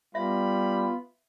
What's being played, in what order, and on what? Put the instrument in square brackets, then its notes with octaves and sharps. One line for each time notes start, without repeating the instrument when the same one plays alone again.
[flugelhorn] G3 [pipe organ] B3 F4 [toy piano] E5 [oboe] B5